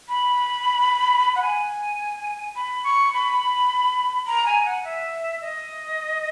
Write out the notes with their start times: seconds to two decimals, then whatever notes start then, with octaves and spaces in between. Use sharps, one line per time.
0.09 B5
1.36 F#5
1.42 G#5
2.56 B5
2.84 C#6
3.14 B5
4.27 A#5
4.46 G#5
4.65 F#5
4.84 E5
5.41 D#5